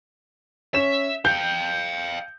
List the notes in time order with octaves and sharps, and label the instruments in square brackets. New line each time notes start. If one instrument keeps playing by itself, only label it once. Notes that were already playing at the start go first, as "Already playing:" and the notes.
[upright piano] C#4 E7 [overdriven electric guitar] E5
[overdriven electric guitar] F5 G5 [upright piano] G6